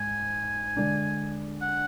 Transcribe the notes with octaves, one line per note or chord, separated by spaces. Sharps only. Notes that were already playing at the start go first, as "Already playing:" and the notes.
Already playing: G#2 G#5
D3 G#3 D4
F#5